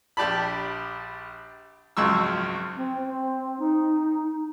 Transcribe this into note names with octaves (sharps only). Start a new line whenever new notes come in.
A#1 G4 D5 A5 B5
G#1 C#2 F#2 F3 C#6 E6
C4
C4
D#4